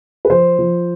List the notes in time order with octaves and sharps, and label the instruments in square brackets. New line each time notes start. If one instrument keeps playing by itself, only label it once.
[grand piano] B4
F3 C5
F3